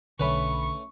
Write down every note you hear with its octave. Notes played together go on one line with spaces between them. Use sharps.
B1 D3 A3 C#4 B4 C#5 B5 C#6